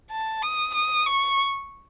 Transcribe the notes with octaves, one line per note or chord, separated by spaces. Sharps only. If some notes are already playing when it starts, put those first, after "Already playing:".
A5
D#6
D#6
C#6